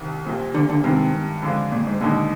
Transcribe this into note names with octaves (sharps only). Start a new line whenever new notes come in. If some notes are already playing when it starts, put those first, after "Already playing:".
Already playing: C2 C3 D#3
A#1 A#2 G3 C4
D3
D3
G2 C3 D#3 G#3
F2 D3 G#3 D4 F4
A#2
G#2
D#2 A#2 D3 G#3 D#4